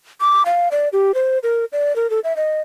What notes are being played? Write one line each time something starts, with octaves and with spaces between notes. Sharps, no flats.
D6
F5
D5
G4
C5
A#4
D5
A#4
A4
E5
D#5